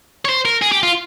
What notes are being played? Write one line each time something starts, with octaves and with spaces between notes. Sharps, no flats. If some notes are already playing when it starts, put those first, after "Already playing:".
C#5
C5
A#4
G#4
G4
F4